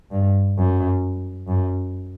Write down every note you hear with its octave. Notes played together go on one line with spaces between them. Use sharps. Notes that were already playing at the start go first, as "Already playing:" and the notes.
G2
F#2
F#2